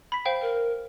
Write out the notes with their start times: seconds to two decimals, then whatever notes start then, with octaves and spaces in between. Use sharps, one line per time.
0.12 B5 B6
0.25 C5 F5 G5
0.42 A#4